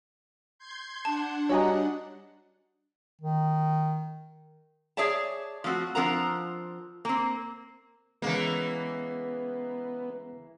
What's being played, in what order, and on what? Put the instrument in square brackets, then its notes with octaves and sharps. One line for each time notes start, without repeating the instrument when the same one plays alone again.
[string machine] C6 G6 G#6
[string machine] D4 F#5 [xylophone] A5
[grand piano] G3 F#4 D#5 [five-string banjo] C#5 G#5 A#5
[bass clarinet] D#3
[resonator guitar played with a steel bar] G#4 C#5 D5 E5 A5
F3 A3 C4 F#4
F3 C4 D4 A#4 F#5 A#5
A#3 C4
[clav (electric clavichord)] C#3 G#3 [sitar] E3 A#3 [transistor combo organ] B3